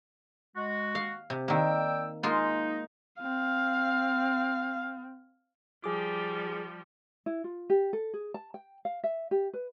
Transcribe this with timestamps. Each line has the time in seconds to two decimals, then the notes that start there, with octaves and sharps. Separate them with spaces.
0.55 G#3 F#4
0.95 F5
1.30 C3
1.48 D#3 A#3 D5 G5 E6
2.23 G#3 A#3 D#4 F4
3.21 C4 F5
5.84 F3 G3 G#4 D6
7.26 E4
7.44 F4
7.70 G4
7.93 A4
8.14 G#4
8.34 A5
8.54 G5
8.85 F5
9.04 E5
9.31 G4
9.54 B4